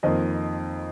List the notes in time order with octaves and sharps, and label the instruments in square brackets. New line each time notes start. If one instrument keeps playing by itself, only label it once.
[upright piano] F2 D#3 A#3 C5 D#5